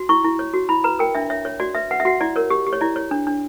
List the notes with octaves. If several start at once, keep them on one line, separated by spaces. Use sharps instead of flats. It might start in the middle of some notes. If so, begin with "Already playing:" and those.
Already playing: F#4
E4 C#6
E4
C#5
F#4
E4 B5
B4 A#5
A#4 G5
D4 E5
C#5 E5
C#5
F#4 D5
B4 E5
B4 F#5
E5
F#4 F#5
E4 D5
A#4 C#5
G4
G4
C#5
E4 D5
C#5
D4
D4